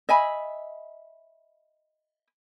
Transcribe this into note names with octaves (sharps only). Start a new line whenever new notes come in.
D#5 E5 G#5 B5